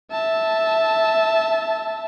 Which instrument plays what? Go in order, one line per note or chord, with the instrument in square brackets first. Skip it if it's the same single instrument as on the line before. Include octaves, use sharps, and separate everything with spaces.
[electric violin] E5 A5